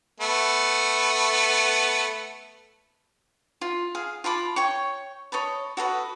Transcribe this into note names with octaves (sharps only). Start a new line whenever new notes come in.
A3 B3
F4
G#4 F5
F4 A5 B5 D6
C#5 G5 C#6
C#5 D#5 A5 B5
F#4 A4 B4 D#5